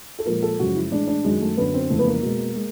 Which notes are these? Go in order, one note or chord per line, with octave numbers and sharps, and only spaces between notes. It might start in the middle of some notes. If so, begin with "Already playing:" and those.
A4
A#2 F3 G#3 A#4
A4
F#2 C#3 F3 G#3 F#4
E4
A2 E3 G#3 D4
D4
F#2 D#3 F#3 G#3
A3
F#2 D3 F#3 B3
C4
F2 C#3 E3 G#3 A3
B3
A#3
B2 G#3
G#3